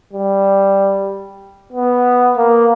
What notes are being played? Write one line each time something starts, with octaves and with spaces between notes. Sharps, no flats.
G3
B3
A#3